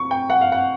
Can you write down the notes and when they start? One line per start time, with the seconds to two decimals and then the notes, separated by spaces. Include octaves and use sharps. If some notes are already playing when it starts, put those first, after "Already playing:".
Already playing: C#6
0.11 G5
0.30 F#5
0.41 F5
0.52 F#5